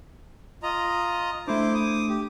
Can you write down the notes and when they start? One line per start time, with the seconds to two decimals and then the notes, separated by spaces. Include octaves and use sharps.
0.63 F4 D#5 A#5
1.48 A3 D4 E4 C5 D6
1.74 D6 D#6
2.09 G4